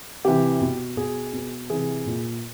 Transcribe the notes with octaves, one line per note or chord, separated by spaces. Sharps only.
C3 E3 G4
B2
B2 G#4
B2
C3 E3 G#4
A#2